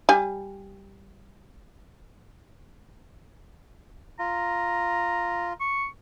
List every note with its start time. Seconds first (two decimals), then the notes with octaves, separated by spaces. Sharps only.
0.09 G3 G#5
4.19 F4 A#5
5.60 C#6